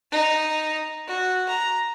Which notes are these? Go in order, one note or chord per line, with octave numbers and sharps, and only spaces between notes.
D#4
F#4
A#5